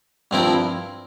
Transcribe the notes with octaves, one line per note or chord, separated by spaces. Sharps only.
G2 F3 C4 E4 A#4